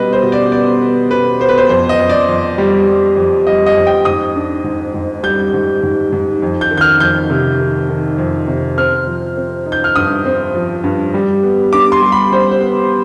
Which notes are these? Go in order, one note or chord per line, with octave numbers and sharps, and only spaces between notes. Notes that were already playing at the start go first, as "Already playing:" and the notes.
Already playing: B2 G3 B3 B4 D#5
C5
B2
D5
B3 D5
B3
B2 B4
B3 C5
B4
C5
F2 C5
D#5
F2
D5
F2
G3
G3
F2
G3 D#5
D#5
F2
G5
G#2 D#6
D4
G#2
G#2
G3 G6
G#2
G#2
G#2
F2
G6
D#3
G6
F6
F2 G6
C3
D#3
D#3
F2
C3
C4 F6
F3
C4
D#4
G6
F6
G2 D#6
C4
F3
G2
G3
B3
D4 D6
C6
G3
B5
G3 C5
C5
B3